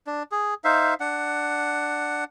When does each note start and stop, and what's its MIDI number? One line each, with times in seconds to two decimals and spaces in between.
0.07 0.23 62
0.32 0.54 68
0.64 0.94 63
0.64 0.94 72
0.64 0.94 76
0.64 0.94 77
1.00 2.24 62
1.00 2.24 78